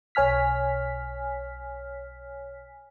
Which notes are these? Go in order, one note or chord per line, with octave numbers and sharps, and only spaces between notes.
B1 C#5 G#5 F6 B6